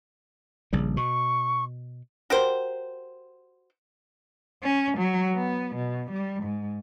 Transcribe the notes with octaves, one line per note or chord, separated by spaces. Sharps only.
A#1 C#3 G3
B2 C#6
F#4 G4 A#4 C5
C#4
F#3
B3
B2
G3
G#2